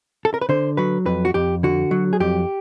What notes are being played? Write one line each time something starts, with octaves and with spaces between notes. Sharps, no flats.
A4
A#4
B4
D3 C5
F#3 B4
F2 B4
F#4
F2 G4
D3 F#4
F#3
G#4
F2 G4